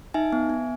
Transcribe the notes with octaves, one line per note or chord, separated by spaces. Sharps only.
D#4 E5 G#5
B3
B3